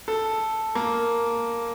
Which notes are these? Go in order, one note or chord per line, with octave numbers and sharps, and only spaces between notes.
A4
A#3